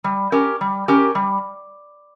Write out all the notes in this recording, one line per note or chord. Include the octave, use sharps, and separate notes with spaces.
G3
C#4 G4 A#4
G3
C#4 G4 A#4
G3